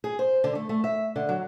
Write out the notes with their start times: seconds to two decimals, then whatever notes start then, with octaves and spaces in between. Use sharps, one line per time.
0.04 G#4
0.19 C5
0.44 D3
0.55 A3
0.69 A3
0.84 E5
1.16 D3
1.29 F#3